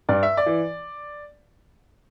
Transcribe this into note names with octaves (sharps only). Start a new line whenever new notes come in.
G2 D5
E5
D5
E3